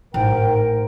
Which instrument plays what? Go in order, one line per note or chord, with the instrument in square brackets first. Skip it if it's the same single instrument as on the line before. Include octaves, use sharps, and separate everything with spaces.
[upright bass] A1 [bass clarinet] G#2 [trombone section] A#4 [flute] G5